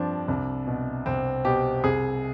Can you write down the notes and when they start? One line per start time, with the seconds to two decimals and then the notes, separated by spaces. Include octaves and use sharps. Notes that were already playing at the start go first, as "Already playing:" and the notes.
Already playing: G2 F3 C4 D4
0.28 C2
0.67 B2
1.06 C2 C4
1.45 B2 G4
1.84 C2 G#4